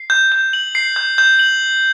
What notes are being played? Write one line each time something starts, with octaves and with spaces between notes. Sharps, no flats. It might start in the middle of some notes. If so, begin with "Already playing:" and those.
Already playing: C7
G6
G6
F#7
C7
G6
G6
F#7